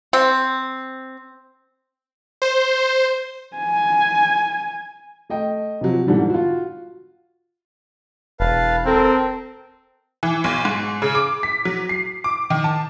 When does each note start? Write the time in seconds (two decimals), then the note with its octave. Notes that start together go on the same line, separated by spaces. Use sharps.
0.13 C4
2.42 C5
3.57 G#5
5.30 A3 D#5 G5
5.81 C3 F3 F#3
6.07 G#2 B2 D3 E3 G3
6.30 F4 F#4
8.40 E1 B4 F5 A5
8.86 C4 A4 A#4
10.23 E3
10.44 B1
10.65 G#2
11.02 C#3
11.15 D6
11.43 B6
11.65 F#3
11.89 C7
12.24 D6
12.50 D#3
12.64 A5